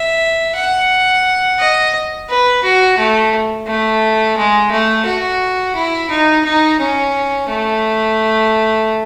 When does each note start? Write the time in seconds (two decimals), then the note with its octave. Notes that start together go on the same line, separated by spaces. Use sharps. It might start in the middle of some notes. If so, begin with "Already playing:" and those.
Already playing: E5
0.55 F#5
1.59 D#5
2.29 B4
2.63 F#4
2.98 A3
3.67 A3
4.37 G#3
4.71 A3
5.05 F#4
5.75 E4
6.10 D#4
6.45 D#4
6.79 C#4
7.49 A3